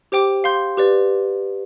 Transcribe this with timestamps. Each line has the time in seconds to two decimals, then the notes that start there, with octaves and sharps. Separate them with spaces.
0.12 G4 C5 G5 D6
0.44 F5 C6 G6
0.77 G4 B4 D5